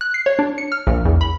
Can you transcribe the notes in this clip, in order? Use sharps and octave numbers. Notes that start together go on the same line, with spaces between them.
F#6
C7
C#5
D4
C#7
F6
A#1
E2
B5